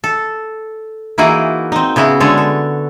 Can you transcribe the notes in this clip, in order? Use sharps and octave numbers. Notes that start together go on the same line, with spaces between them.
A4
E3 A#3 D#4 E4 F#4 G#4
C4 D#4
C#3 B3 E4 F#4
D3 G#3 A4 C#5
A4